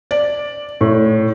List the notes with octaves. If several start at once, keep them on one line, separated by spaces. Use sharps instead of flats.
D5
A2